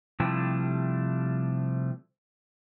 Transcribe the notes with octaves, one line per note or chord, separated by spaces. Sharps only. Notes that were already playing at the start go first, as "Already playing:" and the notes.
C3 F3 G3 A3 D4 E4